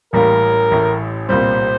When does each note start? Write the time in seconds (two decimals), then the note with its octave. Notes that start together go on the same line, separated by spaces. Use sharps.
0.13 A1 A2 G3 A#3 A#4
0.71 A1 A2 A3
1.29 C2 A#2 G3 C5